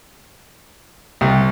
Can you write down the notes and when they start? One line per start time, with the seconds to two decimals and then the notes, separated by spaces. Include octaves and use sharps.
1.21 C2